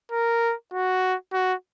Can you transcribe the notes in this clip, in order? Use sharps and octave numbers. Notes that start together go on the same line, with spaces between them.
A#4
F#4
F#4